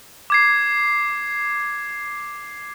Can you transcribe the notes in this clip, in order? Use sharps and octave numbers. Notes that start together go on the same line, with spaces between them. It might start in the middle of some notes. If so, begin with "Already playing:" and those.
D6 G#6 C7